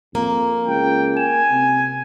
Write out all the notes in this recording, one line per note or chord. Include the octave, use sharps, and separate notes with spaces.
F2 A#3 A#5
C#2 G5
G#5 E7
C3